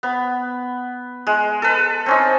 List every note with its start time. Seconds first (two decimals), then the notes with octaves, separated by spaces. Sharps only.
0.03 B3 B5
1.27 G#3
1.62 A4 B4
2.06 C4 C#4 D#4